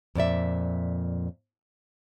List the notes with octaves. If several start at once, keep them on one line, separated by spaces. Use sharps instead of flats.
F2 A#2 D5 E5